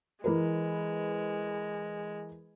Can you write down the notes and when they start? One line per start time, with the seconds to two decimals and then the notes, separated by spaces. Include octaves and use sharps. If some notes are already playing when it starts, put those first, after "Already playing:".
0.24 E3 G#3 A#4 B4